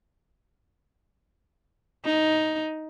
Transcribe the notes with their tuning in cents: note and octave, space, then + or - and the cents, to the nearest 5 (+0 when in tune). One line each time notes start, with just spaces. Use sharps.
D#4 +5